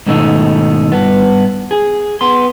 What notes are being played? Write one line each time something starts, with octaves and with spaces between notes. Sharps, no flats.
G#2 B2 D#3 A3 D#4
G2 B3
G#4
B3 C6